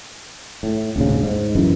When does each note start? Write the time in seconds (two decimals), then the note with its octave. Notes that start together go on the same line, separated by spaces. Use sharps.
0.63 A2
0.96 D#1 D2 G#2 C#3
1.23 G#2
1.55 G1 F#2 E3